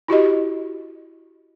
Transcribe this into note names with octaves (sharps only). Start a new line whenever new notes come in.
E4 F#4 G4 D#5